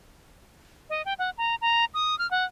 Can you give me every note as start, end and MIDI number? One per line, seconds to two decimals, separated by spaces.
0.90 1.04 75
1.05 1.14 79
1.19 1.30 78
1.38 1.55 82
1.61 1.85 82
1.94 2.17 87
2.19 2.29 89
2.31 2.45 78